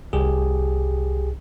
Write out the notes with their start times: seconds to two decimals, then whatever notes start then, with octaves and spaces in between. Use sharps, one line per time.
0.13 C2 G4 G#4